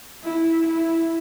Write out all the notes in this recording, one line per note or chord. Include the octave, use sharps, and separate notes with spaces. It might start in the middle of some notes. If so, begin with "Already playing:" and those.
E4
E4